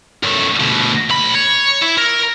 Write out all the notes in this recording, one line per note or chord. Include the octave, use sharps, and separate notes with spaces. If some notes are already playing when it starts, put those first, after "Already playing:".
F#2 A3
D2 B2
B1 B5
C#5
E4
A#4